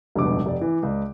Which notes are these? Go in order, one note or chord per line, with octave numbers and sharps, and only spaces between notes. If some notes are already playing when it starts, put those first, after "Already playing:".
F1 C#2 G2 B2 D6
F1 D5
E3
C#2 D5